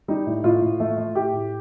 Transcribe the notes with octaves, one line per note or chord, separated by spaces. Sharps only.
G3 D#4
A2
A2 F4
A2
A3
A3
A2 G4
A2